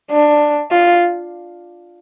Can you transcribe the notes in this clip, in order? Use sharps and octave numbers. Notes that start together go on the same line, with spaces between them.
D4
F4